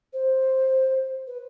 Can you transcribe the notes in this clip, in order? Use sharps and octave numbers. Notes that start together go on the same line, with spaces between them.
C5
B4